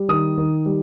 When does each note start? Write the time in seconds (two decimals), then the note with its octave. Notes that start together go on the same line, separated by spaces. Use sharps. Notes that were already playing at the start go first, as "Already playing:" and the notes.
Already playing: G3
0.09 D#3 D#6
0.37 D#3
0.66 G3